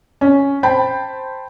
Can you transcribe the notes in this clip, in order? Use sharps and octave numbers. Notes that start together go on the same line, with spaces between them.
C#4
C5 G5 A5 B5